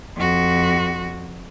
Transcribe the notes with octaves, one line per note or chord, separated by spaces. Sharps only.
F2 F#4